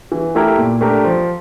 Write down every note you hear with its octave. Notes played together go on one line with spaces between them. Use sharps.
E3
A3 E4 G4 A#4
A#2
A3 D4 G4 A#4
F3